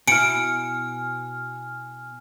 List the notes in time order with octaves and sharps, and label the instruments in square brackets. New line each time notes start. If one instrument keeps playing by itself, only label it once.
[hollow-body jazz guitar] B2 E4 [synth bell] G#5 F6 [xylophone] C#7 D7